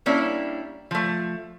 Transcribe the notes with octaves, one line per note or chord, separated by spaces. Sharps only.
G3 A#3 C#4 D4 E4
F3 A3